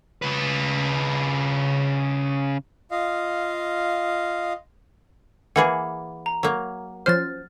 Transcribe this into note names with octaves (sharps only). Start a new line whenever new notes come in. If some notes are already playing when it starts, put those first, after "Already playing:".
C#3 B4
F4 D#5 F5
E3 A#3 G#4 F#5 B5
A#5
F#3 A#3
F3 C#4 C5 F6 A6